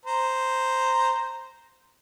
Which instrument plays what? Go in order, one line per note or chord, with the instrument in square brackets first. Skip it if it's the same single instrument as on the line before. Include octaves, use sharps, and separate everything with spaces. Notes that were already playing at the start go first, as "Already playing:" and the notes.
[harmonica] C5 A#5